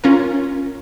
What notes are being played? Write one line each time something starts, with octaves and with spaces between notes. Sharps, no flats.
C#4 F4 A#4